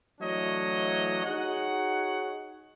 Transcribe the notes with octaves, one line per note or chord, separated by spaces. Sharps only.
E3 F#3 A3 D4 C#5 D#5
D#4 F#4 G#4 C#5 F#5